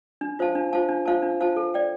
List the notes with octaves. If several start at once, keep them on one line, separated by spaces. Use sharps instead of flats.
D4
F4 C5 F5 A5
D4
F4 C5 F5 A5
D4
F4 C5 F5 A5
D4
F4 C5 F5 A5
A4
D5 G5